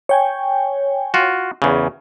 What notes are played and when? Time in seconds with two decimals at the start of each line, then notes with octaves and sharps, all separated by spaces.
0.09 C#5 G5 G#5
1.14 F4 F#4
1.62 E2 C#3